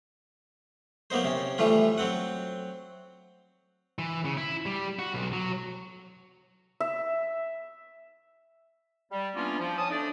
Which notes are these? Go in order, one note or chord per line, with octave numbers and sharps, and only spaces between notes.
F#3 A#3 B3 D#4 C5
C3 C#4
E3 F3 G3 A3 F4
F#3 C4 F#5
E3
C#3
E4
G3
F#4
B1
F#3
E5
G3
E3 A#3 B3 C#4 D4 F4
F3
C#4 A5 D#6
A3 D4 D#4 D5